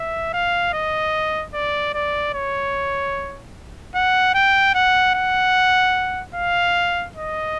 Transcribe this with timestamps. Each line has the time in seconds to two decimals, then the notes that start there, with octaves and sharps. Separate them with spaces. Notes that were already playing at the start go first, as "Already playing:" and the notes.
Already playing: E5
0.33 F5
0.73 D#5
1.54 D5
1.94 D5
2.34 C#5
3.95 F#5
4.34 G5
4.75 F#5
5.15 F#5
6.35 F5
7.16 D#5